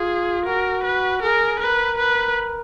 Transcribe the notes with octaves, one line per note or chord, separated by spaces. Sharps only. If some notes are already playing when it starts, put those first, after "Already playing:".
Already playing: F4 G#4
F#4 A#4
B4
G#4 A#4
A#4 B4
B4